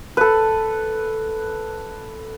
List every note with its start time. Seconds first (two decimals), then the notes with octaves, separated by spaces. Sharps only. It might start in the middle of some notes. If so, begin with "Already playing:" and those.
0.17 A4 B4